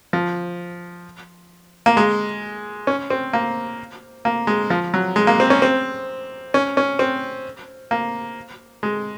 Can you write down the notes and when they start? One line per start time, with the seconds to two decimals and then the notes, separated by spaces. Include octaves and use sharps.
0.13 F3
1.86 A#3
1.97 G#3
2.87 C#4
3.10 C4
3.33 A#3
4.25 A#3
4.47 G#3
4.70 F3
4.94 F#3
5.16 G#3
5.27 A#3
5.40 C4
5.50 C#4
5.62 C4
6.54 C#4
6.77 C#4
6.99 C4
7.91 A#3
8.83 G#3